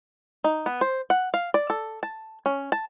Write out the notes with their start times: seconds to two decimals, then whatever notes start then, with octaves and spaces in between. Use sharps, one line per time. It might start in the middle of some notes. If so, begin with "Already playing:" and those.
0.44 D#4
0.66 B3
0.81 C5
1.10 F#5
1.34 F5
1.54 D5
1.70 A4
2.03 A5
2.46 C#4
2.72 A5